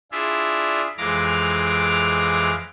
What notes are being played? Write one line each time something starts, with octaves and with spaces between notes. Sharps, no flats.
D4 E4 F4 G#4 E5
F2 E3 G#3 F5 A#5 D6